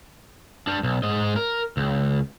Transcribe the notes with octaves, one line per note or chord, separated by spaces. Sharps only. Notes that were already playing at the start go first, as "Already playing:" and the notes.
G3 D4
B1
G#2 D#5
A#4
C#2